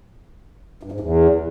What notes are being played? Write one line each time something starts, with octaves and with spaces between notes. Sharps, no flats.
G2
G#2
E2